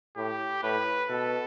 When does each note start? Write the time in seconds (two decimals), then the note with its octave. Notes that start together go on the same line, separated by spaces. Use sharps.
0.16 A2 G4
0.63 A2 B4
1.10 B2 A4